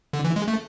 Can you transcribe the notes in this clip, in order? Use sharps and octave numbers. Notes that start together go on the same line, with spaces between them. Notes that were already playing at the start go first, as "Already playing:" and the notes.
D3
E3
G#3
A3